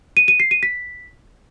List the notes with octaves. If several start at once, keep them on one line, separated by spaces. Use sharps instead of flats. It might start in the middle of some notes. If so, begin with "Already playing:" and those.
D#7
D#7
C7
D#7
B6